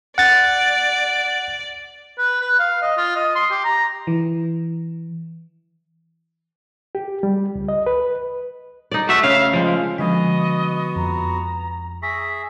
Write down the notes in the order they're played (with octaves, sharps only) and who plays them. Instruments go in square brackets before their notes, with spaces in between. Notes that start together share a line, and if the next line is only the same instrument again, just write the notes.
[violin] D5 [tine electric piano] F#5 A6
[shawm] B4
B4
F5
D#5
F4
D#5
C6
G4
A#5
[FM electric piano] E3
[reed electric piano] G4
G3
C#2
D#5
B4
[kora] D#4 D5
[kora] A3 [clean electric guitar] F#4 E5
[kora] C#3 [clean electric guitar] F5
[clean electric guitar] F3 G#3
[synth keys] D3 [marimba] F3 G#3 [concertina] B3 F#4 [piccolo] D#5
[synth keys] F2 [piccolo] A#5
[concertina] G#4 E5 [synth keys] C#6 A#6 [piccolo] B6